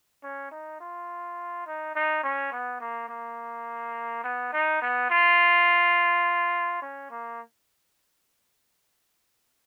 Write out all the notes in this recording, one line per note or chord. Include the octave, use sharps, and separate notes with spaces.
C#4
D#4
F4
D#4
D#4
C#4
B3
A#3
A#3
B3
D#4
B3
F4
C#4
A#3